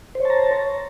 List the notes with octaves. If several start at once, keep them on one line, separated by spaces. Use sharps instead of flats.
C5 C#5 A5 A#5